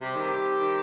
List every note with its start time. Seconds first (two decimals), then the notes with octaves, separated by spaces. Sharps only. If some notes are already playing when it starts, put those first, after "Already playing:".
0.01 C3 G3 C4 G4
0.16 D#3
0.60 D#3